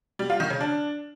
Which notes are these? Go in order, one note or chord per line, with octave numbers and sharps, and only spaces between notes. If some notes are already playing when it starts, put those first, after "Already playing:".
G3
F4
D#3
C#3
D4